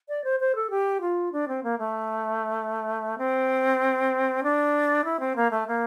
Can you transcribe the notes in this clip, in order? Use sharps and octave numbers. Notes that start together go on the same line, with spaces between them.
D5
C5
C5
A4
G4
F4
D4
C4
A#3
A3
C4
D4
E4
C4
A#3
A3
A#3